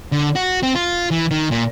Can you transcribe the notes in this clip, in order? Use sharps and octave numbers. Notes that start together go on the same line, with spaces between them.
D3
F#4
C4
F4
E3
D#3
A#2